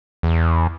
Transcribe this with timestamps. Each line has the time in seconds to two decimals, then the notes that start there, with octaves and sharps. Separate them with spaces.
0.23 E2